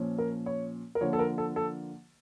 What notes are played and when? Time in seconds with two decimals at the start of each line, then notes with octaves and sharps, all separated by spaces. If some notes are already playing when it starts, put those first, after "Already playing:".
Already playing: A#2 F3 C#4
0.18 A#4
0.46 C#5
0.95 A#4
1.01 D3 F3 A#3 C#5
1.13 A4
1.19 A#4
1.38 A4
1.56 A4